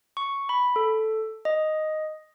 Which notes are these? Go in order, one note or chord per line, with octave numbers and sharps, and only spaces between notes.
C#6
B5
A4
D#5